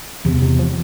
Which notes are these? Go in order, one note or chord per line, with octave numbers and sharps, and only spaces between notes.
E2 C3
C3
F3